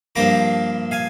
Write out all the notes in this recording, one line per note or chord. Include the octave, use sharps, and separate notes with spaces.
G2 F3 A#3 A#5 D6
F5 G#5